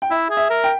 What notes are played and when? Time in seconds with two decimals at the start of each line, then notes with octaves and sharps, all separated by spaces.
0.02 G5
0.10 E4 E5
0.30 G#4
0.37 E5
0.50 A#4
0.64 G5